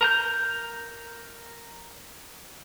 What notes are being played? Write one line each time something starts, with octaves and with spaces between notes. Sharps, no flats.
A#4 A#5 G6